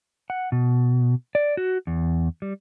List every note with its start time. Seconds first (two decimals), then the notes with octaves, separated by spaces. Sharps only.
0.30 F#5
0.52 B2
1.35 D5
1.57 F#4
1.87 E2
2.42 G3